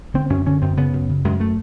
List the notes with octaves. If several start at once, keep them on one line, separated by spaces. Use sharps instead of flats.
D3 C4
F#2 C#4
D3 C#4
F#2 C4
C#3 B3
F#2
C#3
F#2 G#3
A3